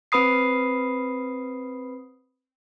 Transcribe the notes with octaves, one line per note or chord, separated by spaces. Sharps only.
C4 B4 B5 D#6 C7